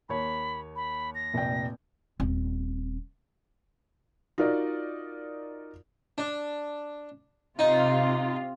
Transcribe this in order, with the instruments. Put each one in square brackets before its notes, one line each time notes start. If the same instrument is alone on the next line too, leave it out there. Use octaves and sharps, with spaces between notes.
[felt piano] D#2 C#5 [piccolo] B5
[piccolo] B5
A#6
[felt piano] F1 A#1 G5
[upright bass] D#1 C4
[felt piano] D#4 F4 F#4 A#4 D5
[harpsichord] D4
[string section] C3 F4 [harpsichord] D#4